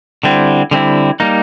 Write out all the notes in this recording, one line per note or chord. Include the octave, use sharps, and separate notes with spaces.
D3 G3 C4 E4
D3 G3 C4 E4
G3 A#3 D#4